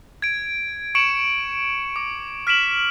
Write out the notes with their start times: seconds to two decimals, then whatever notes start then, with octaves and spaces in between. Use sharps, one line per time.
0.22 G#6 D7
0.95 C#6 C#7 D7 E7 F#7
1.96 D6
2.47 F6 B6 D7 E7 F#7